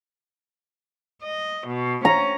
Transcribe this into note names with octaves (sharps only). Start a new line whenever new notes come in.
D#5
B2
C#4 A#5